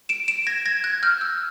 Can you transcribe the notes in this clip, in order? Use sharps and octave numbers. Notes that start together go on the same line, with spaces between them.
D7 E7
D7 E7
G#6 A#6
G#6 A#6
F#6 G#6
F6 G6
E6 F#6